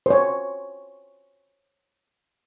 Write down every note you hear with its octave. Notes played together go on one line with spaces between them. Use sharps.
C5 C#5